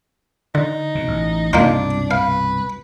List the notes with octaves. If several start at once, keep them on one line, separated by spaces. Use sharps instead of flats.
D3 D#4
B2
A1
C2 G2 B2 A#3 D4 D#4 F4
B4 F5